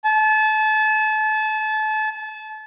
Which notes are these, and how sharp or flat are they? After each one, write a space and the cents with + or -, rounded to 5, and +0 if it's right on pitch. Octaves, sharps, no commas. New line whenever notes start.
A5 -30